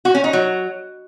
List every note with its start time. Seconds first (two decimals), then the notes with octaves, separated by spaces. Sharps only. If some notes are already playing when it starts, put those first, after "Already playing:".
0.05 F#4
0.14 C#4
0.24 D#4
0.33 F#3